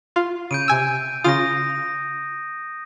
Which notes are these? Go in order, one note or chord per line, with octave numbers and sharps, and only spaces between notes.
F4
C#3 G6 D7 D#7
C3 G#5 E6
C#3 F4 D#6 A#6